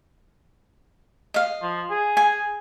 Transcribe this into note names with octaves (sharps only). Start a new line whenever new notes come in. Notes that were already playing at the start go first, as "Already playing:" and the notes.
D#5 F5
F3
G#4
G#5